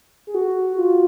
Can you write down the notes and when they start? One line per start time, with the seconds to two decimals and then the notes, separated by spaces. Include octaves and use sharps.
0.27 G#4
0.34 F#4
0.77 F4